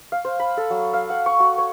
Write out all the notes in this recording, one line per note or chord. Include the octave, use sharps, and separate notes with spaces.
F5
C5
B5
A4
F#3
F5
F#5
C#6
F#4
C#5